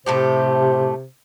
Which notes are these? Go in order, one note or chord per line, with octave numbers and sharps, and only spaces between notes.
A2 C3 A3 G4 C5